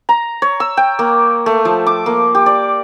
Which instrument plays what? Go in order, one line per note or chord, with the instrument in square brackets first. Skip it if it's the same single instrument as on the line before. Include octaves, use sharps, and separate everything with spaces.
[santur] A#5
C#5
E6
G5
A#3
A3
F3
D6
A#3
G4
D5